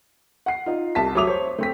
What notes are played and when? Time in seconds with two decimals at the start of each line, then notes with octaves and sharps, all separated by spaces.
0.46 F#5 C7
0.66 D#4 F4
0.95 C2 A5 B6
1.15 F#3 A3 E5 D6 D#6 F7
1.27 C5 C#5
1.59 A3 C4 B6